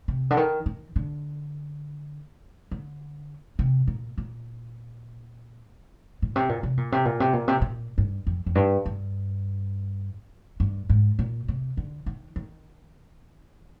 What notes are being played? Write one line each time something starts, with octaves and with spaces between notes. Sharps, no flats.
C3
D3
D#3
D#3
D3
D3
C3
A#2
A#2
A#2
C3
A#2
C3
A#2
C3
A#2
C3
A#2
C3
A#2
G2
F2
F2
G2
G2
G2
G#2
A#2
C3
D3
D#3
D#3